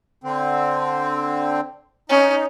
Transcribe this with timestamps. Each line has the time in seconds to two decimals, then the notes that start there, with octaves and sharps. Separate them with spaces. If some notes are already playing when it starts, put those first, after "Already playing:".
0.24 D3 C4
2.10 C#4 D#4